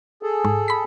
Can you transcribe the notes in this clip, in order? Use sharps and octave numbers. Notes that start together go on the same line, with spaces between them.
G#4 A4
G#2
B5 B6